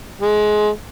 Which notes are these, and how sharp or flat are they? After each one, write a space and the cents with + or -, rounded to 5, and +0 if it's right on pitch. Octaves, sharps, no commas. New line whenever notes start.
G#3 +20